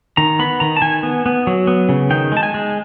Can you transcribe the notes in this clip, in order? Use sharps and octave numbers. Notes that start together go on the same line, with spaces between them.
D#3 A#5
B3 B5
D#3 A#5
A5
D#3 G#5
B3
B3
F#3
B3
C#3
D#3 G5
G#3 A5
G#5
G#3